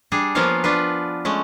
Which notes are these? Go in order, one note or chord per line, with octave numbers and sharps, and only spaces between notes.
G3 D4 G#4
F3 A#3 B3 F4 C#5 F5
D4 F4 B4
G#3 A3 C#4